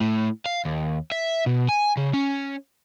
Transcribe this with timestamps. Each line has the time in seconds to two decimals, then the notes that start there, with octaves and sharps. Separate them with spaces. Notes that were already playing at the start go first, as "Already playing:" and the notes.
0.01 A2
0.46 F5
0.65 D#2
1.12 E5
1.46 B2
1.69 G#5
1.97 C#3
2.14 C#4